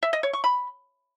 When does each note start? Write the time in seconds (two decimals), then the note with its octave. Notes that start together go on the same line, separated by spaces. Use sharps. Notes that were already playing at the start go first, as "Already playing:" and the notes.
0.03 E5
0.13 D#5
0.23 C#5
0.33 C#6
0.44 B5